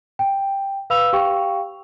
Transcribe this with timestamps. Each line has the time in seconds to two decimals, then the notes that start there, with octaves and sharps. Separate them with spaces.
0.19 G5
0.90 B4 F5 B5 E6 F7
1.13 G4 F5 G5 C#6